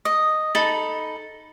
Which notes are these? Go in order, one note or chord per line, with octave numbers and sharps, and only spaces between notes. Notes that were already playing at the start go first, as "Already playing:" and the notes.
D#5
D#4 A4 B5